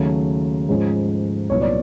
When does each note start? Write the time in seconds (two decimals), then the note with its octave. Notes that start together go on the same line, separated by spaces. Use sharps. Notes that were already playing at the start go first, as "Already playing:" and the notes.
Already playing: D#2 C#3 F#3 A3
0.68 G#2 F3 G#3 C#4
1.50 C2 A#2 F#3 B3 D#4 C#5
1.61 D5